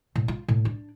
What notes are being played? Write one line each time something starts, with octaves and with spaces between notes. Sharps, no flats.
A2
F4
A2
D4